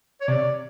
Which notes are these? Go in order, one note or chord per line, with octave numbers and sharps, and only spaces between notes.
C#5
C3 D5